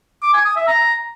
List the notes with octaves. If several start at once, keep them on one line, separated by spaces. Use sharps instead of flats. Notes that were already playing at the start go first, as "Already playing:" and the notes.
D6
G#5
D#6
E5
A#5